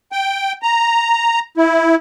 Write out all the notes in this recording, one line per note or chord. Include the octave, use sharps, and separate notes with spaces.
G5
A#5
E4